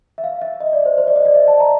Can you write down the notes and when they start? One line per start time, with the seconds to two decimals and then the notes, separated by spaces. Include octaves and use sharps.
0.18 E5
0.24 F5
0.42 E5
0.60 D#5
0.73 D5
0.85 C5
0.98 C5
1.07 D5
1.16 D#5
1.26 D5
1.35 E5
1.48 A5
1.60 A#5